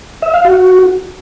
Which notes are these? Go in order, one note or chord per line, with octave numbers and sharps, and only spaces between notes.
E5
F5
F#4